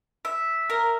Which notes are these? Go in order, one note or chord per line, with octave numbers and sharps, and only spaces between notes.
E5
A#4